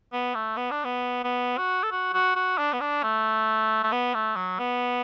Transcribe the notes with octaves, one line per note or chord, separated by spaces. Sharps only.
B3
A3
B3
D4
B3
B3
F#4
A4
F#4
F#4
F#4
D4
B3
D4
A3
A3
B3
A3
F#3
B3